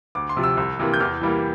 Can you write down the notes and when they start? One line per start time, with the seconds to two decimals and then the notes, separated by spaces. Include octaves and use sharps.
0.15 D2 D6
0.29 C6
0.37 C3 F3
0.43 E6
0.57 C2 E6
0.79 C3 E3 A#3
0.94 G6
1.00 E2 F6
1.21 E3 G3 A#3